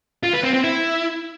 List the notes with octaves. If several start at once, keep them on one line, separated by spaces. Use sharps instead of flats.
F4
B4
C4
C4
E4